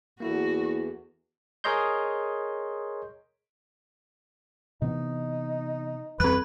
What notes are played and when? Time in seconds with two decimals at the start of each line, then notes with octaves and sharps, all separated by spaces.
0.20 E2 A#3 E4 F#4 A4
1.64 G#4 A#4 C#5 D#5 C6 G6
4.82 C3 E3 B3 D#4
6.20 F2 E3 G3 C4 B4 F#6